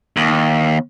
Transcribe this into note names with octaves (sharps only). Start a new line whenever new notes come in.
D#2